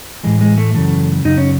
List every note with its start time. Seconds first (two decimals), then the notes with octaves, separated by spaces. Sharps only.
0.23 A2 E3 G#3
0.41 G#3
0.58 A3
0.74 F#2 C#3 E3 A3
1.25 F#2 C#3 D#4
1.38 C#4